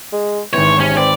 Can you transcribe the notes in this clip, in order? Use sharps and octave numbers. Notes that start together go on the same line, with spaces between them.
G#3
G#1 E3 C4 C#5
C3 C#4
C4 B4 D5